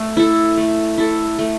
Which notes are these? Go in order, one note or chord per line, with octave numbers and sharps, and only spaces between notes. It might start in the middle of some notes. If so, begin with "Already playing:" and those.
Already playing: A3
E4 A4
A3
E4 A4
A3